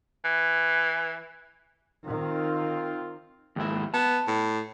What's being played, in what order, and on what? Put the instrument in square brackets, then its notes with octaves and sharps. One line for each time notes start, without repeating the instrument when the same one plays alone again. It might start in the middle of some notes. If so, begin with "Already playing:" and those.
[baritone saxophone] E3
[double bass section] D#3 [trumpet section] C4 F4
[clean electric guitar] D#2 G#2 E4
[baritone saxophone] B3 [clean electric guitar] A5
[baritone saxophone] A2